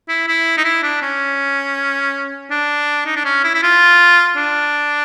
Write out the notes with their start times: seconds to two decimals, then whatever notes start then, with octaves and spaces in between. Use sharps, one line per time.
0.08 E4
0.27 E4
0.57 D#4
0.64 E4
0.83 D4
1.02 C#4
2.51 D4
3.06 D#4
3.16 D4
3.25 C#4
3.44 E4
3.54 E4
3.63 F4
4.37 D4